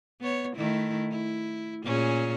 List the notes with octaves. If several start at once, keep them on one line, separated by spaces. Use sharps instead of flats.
B3 C#5
D#3 A3 E4
E4
A#2 C#4 G#4